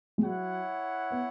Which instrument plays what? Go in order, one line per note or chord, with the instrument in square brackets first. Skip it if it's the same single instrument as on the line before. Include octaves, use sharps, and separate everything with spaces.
[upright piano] G#3
[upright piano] F#3 [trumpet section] E4 C#5 F#5
[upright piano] B3